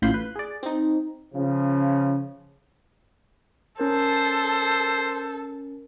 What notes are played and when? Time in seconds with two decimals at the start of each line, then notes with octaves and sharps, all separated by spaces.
0.02 A1 A2 F4 B5 G6 C7
0.14 B4
0.35 G#4 D5
0.63 C4 D#4
1.34 C#3 F3
3.80 C#4 A4 A#4 C5